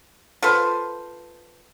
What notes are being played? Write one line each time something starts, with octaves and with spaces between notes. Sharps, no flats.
F4 A4 B4 C5